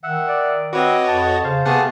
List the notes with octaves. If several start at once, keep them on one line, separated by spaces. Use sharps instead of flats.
D#3 E5 F#5
D5
C4 F#4 B4 C#5 D#5 D6
F2 A5
C#3 C5 F5
C3 A3 B3 G4 G#4 F5 F#5 A5